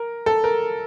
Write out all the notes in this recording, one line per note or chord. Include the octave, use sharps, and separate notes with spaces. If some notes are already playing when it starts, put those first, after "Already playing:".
Already playing: A#4
A4
A#4